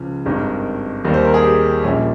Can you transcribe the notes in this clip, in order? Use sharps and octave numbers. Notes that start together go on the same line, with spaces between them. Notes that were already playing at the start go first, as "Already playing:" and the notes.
Already playing: C#2 C#3 F3
G#1 G2 D#3
D#2 D#3 G3
C5
A#4
G#4
G4
A#1 A#2 G3 C#4